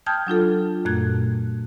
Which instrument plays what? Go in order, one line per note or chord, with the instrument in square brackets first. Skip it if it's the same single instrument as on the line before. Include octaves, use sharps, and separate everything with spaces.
[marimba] G5 A5 D#6 F6 G6 G#6
F#3 D4 F4 A4
F#2 A#2 A3 F#6 G#6